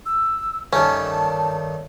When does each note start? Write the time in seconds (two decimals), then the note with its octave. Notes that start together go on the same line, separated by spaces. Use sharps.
0.06 E6
0.73 G2 D#3 A3 C#4 A5